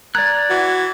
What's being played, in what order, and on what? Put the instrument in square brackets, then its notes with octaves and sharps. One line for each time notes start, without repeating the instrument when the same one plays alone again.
[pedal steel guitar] D5 F#6 [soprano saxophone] A#5 [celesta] G#6 A6
[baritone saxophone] E3 [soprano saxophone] F#4